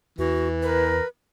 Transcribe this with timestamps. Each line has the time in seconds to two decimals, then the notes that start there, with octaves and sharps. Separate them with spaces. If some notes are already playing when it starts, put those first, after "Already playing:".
0.18 E2 E3 F#4
0.62 A#4 B4